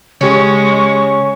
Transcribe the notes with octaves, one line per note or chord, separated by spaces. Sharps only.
C#3 G#3 C#4 G4 C#6